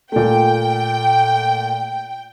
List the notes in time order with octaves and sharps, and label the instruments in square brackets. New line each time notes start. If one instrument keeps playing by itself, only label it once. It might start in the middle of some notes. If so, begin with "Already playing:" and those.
[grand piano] A#2 A3 [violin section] G5